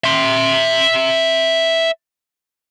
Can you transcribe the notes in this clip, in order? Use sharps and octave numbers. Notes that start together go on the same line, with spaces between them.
E5 C6